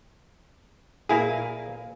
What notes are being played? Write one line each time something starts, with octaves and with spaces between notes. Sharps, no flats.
A#2 A#3 E4 G#4 F5 G#5